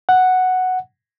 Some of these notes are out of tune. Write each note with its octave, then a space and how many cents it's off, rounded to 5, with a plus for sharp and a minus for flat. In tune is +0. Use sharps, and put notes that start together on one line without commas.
F#5 +0